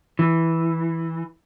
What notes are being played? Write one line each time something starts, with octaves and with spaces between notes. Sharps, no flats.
E3